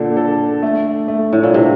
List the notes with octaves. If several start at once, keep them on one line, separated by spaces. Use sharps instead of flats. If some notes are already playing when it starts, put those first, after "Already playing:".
Already playing: A#2 D3 A4
A4
A3
A3
A2
A#2
C3 D4